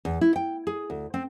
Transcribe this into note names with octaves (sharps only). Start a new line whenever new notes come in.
E2
E4
G5
G#4
D2
C4